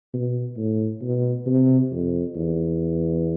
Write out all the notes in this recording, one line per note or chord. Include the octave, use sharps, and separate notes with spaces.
B2
A2
B2
C3
F2
E2